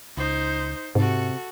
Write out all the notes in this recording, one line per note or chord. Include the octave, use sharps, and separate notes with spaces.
C#2 D#4 C5
G#2 C3 F#4 A4